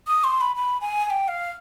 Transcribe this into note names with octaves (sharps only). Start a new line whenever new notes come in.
D#6
C6
B5
B5
G#5
G#5
G5
F5